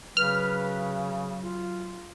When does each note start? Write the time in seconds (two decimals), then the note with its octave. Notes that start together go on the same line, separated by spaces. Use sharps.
0.17 C#3 F#3 B4 F6
1.43 F4